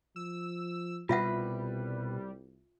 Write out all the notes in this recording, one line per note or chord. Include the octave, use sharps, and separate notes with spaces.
F3 E6
C2 B2 G3 F4 B4 E5 F#5